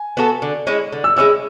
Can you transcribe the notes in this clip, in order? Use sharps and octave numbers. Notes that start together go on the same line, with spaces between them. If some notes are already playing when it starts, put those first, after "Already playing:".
Already playing: G#5
B3 F#4 A4
D3
G#3 C#4 E4
D3
E6
G#3 C#4 E4 E6